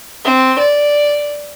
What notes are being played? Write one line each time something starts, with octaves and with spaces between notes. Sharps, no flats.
C4
D5